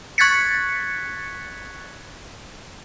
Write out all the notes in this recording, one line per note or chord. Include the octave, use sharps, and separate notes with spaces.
C#6 F#6 G#6 A6 B6 C#7